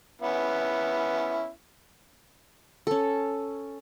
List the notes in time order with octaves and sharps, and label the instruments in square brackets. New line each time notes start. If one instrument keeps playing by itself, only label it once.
[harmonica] B3 C#4 E4
[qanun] C#4 A4